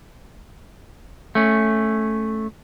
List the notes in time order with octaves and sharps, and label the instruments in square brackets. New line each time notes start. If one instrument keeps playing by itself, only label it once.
[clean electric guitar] A3 C#4